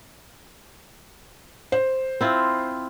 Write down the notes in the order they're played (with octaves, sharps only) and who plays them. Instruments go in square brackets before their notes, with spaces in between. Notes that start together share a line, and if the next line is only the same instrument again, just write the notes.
[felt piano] C5
[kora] C4 E4 F4